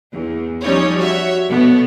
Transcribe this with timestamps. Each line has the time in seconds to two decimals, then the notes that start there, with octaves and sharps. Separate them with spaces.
0.14 E2
0.63 F3 G3 C#4 D#4 C#5
0.98 F#4 C#5 E5
1.50 B2 A3 B3